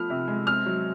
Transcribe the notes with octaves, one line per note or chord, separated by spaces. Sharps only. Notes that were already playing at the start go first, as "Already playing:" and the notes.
Already playing: F3 A3 B3 F6
C3
G#3
C4 F6
F#3